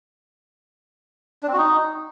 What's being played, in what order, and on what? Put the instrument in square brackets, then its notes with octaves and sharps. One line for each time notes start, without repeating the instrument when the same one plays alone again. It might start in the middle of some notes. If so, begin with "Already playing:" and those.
[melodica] D4
C4
F#4
D#4